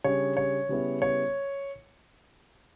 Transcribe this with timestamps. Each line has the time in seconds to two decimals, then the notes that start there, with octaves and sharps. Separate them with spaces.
0.04 C#3 G3 D4 C#5
0.37 C#5
0.69 C#3 G3 B3 E4
1.02 C#5